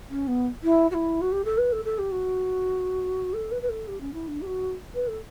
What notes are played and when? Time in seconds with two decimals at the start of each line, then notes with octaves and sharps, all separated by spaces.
0.09 C#4
0.27 B3
0.63 E4
0.91 F#4
0.94 E4
1.21 F#4
1.32 G4
1.45 A4
1.58 B4
1.72 A4
1.85 A4
1.98 G4
2.11 F#4
3.33 A4
3.51 B4
3.62 B4
3.69 A4
3.87 G4
4.00 C#4
4.13 E4
4.28 D4
4.41 G4
4.46 F#4
4.94 B4
5.07 A4